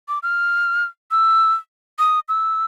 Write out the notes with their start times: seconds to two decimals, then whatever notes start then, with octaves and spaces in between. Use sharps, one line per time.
0.09 D6
0.23 F6
1.11 E6
1.99 D#6
2.29 E6